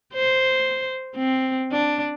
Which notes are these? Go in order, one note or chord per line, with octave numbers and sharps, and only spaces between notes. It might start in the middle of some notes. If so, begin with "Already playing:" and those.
C5
C4
D4